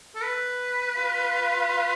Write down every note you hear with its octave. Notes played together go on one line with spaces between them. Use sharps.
A4
B4
F4